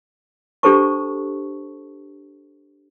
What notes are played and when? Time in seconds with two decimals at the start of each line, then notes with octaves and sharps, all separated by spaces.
0.63 D4 G4 A4 C5 A5 C#6